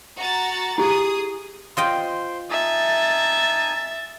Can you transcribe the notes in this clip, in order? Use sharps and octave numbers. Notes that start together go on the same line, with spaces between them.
F#4 A#5 A6
E4 G4 G#4 D#6
F4 C5 D#5 G5 C6
D#4 E5 G#5 A5 A6